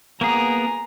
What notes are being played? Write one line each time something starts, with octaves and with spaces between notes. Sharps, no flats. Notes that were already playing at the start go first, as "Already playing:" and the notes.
A#3 B3 G#4 G#5 A#5